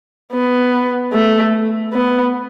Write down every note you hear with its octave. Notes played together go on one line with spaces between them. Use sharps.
B3
A3
B3